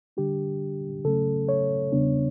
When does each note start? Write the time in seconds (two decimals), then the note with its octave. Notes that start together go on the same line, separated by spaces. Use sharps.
0.17 D3 G3 D4 G4
1.04 C#3 F#3 A3 C#4 A4
1.49 C#5
1.92 E2 C#3 G3 B3 D4